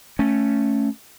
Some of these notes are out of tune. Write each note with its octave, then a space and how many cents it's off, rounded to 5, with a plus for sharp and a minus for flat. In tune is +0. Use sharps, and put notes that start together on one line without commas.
A3 +0 C#4 +0